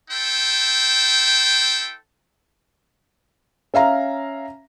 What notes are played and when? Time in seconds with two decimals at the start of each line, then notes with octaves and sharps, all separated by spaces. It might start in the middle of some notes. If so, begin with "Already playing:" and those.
0.11 E4 A4 C5 G5
3.74 C#4 E5 F5 A#5